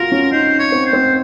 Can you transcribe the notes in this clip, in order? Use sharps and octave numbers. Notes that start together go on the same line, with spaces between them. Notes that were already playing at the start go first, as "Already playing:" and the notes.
Already playing: F4 F#4 A#4
C#4
D#4 C5
C#5
C4
C5
C4